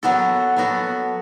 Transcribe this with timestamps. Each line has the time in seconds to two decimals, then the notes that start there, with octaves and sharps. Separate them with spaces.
0.03 F#3 B3 F#4 A4
0.56 F#3 B3 F#4 A4